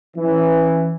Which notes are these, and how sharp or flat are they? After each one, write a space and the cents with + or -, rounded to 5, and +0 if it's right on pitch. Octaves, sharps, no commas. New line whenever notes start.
E3 +0 C#4 -15